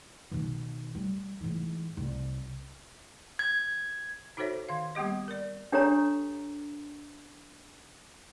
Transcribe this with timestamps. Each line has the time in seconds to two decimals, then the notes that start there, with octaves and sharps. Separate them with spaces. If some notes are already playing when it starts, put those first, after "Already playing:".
0.31 B2 D#3
0.95 G3
1.41 G#2 E3
1.97 C2
3.39 G#6
4.37 D#4 F#4 A4 C5 C#5 E5
4.69 D#3 F5
4.95 G3 A#3 B3 G4 D#5
5.28 A#4 D5
5.72 D4 G4 A4 C#5 A#5